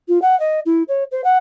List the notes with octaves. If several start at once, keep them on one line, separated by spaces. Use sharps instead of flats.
F4
F#5
D#5
E4
C#5
C5
F#5